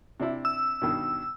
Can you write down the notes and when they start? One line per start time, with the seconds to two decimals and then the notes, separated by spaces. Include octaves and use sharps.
0.20 C3 D4 E4
0.45 E6
0.82 G2 B2 D#3